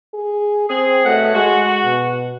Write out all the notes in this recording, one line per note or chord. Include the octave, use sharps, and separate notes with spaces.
G#4
C4 G#4
B2 F#3 A3 F#5
G#3 F#4
B2